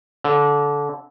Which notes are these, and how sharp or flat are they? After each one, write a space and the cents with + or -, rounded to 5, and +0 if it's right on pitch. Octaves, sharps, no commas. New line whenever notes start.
D3 -20